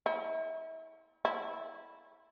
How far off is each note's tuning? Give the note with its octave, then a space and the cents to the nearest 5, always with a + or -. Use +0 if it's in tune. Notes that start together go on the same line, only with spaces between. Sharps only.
E4 -35
E4 -10